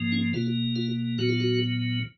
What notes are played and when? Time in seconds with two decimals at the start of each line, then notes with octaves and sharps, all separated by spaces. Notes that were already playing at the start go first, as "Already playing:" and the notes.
Already playing: G#2 F3 A#3
0.12 C#4
0.34 B2 A#3 F4
0.76 F4
1.18 A#2 F#3 B3 F#4
1.29 F4
1.40 F#4